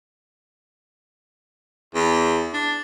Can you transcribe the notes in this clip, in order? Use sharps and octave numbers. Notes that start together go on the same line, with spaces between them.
E2
D4